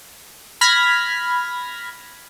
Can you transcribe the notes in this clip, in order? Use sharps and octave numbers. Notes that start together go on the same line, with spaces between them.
B5 F6 G#6 A#6 B6